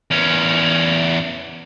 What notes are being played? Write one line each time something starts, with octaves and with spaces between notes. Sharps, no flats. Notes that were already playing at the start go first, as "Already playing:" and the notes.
E2 C#4